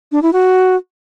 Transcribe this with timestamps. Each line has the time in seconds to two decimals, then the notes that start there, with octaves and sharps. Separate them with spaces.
0.12 D4
0.22 E4
0.33 F#4